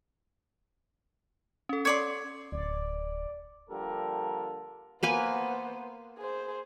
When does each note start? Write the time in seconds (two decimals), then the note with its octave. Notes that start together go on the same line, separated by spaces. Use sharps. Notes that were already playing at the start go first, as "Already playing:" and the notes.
1.69 C#4 A4
1.85 C#5 D5 C6
2.52 D1 D5
3.70 D3 F3 G3 A#3 A4 A#4
5.03 A#3 B3 B4 C5 G#5
6.18 G#4 C5